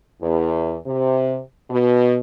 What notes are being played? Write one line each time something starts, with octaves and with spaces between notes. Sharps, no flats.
E2
C3
B2